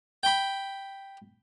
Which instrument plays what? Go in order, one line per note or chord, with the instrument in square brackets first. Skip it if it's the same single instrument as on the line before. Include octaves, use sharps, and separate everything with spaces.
[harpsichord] G5 B5